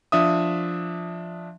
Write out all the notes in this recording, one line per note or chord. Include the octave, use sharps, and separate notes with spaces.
F3 D4 E5 D#6